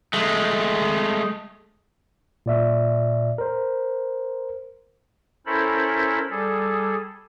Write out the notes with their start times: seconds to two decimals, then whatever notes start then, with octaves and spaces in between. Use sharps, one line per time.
0.14 G#3 A3
2.46 A#2 D5 E5
3.38 A#4 C5
5.46 C#4 E4 A4 A#4 C5 B5
6.31 G3 G#4 A4